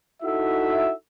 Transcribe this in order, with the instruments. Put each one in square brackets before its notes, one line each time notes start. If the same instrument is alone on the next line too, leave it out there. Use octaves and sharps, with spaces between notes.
[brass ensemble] D#4 E4 F#4 A4 E5